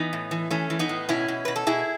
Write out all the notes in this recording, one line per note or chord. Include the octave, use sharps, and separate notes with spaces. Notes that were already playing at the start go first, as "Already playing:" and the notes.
Already playing: E3 B3 D#4
A2
E3
E3 A3 C#4
E3
B3 D#4
A2
B2 C#4 E4
B2
B2 B4
A4
B2 E4 G#4